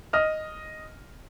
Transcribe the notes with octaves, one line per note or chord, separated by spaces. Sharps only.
D#5 F6